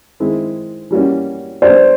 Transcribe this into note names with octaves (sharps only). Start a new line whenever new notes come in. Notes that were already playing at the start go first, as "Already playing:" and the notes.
D#3 G#3 C4 E4
E3 G3 A#3 C#4 F#4
G3 B3 D4 C5 D5